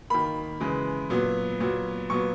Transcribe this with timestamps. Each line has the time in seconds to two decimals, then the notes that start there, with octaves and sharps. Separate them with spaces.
0.10 D#3 A#3 B5
0.60 C#3 E3 G#3
1.10 A#2 F#3 B3
1.60 A#2 F#3 B3
2.10 A#2 F#3 B3 C#6